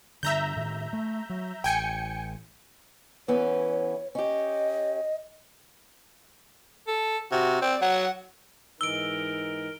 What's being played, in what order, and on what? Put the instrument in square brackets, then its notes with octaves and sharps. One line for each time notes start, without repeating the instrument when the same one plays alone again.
[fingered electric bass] G2 D3 [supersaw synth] E5 A#5 G6
[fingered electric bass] A2 D#3
A3
F#3
[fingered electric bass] A1 [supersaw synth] G5 G#5 C#7
[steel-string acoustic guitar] E3 B3 C#4 [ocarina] C#5
[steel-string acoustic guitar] C#4 G4 [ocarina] D#5
[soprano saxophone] A4
[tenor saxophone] C3 [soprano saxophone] F#4
[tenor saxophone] C4 [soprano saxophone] D5
[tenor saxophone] F#3 [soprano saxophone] F#5
[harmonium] G#2 E3 D#4 [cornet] A#4 [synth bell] E6 [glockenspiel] D7 G7